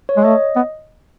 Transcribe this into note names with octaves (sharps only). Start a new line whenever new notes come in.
C#5
G#3
A3 D#5
B3